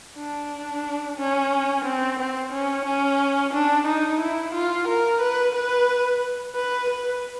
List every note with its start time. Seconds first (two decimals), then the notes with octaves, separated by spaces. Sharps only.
0.17 D4
1.17 C#4
1.85 C4
2.19 C4
2.52 C#4
2.86 C#4
3.53 D4
3.86 D#4
4.21 E4
4.54 F4
4.88 A#4
5.21 B4
5.55 B4
6.55 B4
6.90 B4